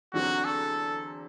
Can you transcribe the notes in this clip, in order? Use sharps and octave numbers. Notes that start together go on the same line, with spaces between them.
E2 D3 F#3 C4 F#4
A4